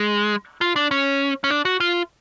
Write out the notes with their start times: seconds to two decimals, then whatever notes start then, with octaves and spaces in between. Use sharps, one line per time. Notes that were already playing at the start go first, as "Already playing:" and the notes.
Already playing: G#3
0.61 F4
0.76 D4
0.91 C#4
1.44 C#4
1.50 D4
1.65 F#4
1.80 F4